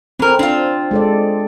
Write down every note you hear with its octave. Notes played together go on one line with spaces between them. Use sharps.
E3 C4 A#4
C4 D4 F4
G#3 A4 D5